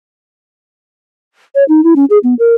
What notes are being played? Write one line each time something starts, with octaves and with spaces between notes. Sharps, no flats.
C#5
D#4
E4
C#4
G#4
B3
A#4